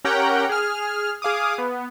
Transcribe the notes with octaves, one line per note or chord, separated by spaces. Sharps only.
C#4 G4 A#4 F#5 G5 A#5
G#4 F6
G#4 F5 D6 D#6
B3